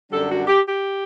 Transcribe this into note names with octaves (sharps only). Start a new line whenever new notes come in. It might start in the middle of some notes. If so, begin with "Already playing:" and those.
F#2 D3 G3 D4 A4
F#4
G4
G4